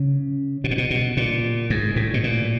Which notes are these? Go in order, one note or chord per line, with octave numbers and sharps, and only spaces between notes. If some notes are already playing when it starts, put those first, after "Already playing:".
Already playing: C#3
B2
A#2
B2
B2
A#2
G#2
A2
B2
A#2